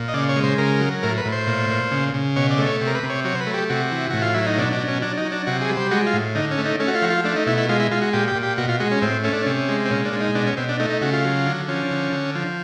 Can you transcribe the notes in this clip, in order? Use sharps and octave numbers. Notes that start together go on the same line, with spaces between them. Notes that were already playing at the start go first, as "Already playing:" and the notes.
Already playing: A#2
D#5
C#3 D5
C#5
G#3
C5
C#3 A#4
F#3
A2 A#4
B4
A2
C5
A#2
A#2
C#3
C#3
B2 C#5
D5
A3
C#5
C3
A#4
B4
C3
C#5
F#3 C#5
C5
B4
A3
G4
C3 F#4
E3
A2 F#4
F4
F#3 E4
D#4
B2 D4
D4
F#3
C#4
F#3 D4
D#4
F#3
D4
C3 F#4
G#4
G3
C5
G#3 F#4
F4
A2
D3 D#4
C#4
A3
D#4
A3 C#4
F#4
F4
F3 F#4
F4
A3 D4
D#4
B2 E4
E4
G#3 F4
E4
G#3 F4
F#4
A#2 G4
G4
A#2
G4
B2 F#4
F4
G#3 F#4
C#4
A2 C4
A3 C#4
D4
C3 C#4
G#3
C4
A#2 C#4
D4
G#3
D#4
B2 D4
C#4
B2 C4
D4
A3 D#4
D#4
C#3 F#4
F4
F#3
D3
F3 C#4
D3
D3
F3